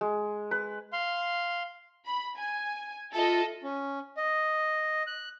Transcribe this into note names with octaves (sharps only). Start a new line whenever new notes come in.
G#3
B4
F5 C6
B5
G#5
F4 A4 D#5 E5
C#4
D#5
F#6